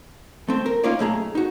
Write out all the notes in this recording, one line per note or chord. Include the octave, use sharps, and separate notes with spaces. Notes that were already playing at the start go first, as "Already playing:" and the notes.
A3 C4
A#4
A#3 C#4 D#4 F4 C#5 D5
B1 A3 G#4 A#5
D#4 F#4